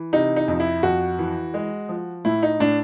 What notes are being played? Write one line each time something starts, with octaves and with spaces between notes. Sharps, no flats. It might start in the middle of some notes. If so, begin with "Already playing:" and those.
Already playing: E3
C3 D#4
D#4
F2
E4
F2 F#4
E3
G#3
F3
A2 E4
D#4
A2 D4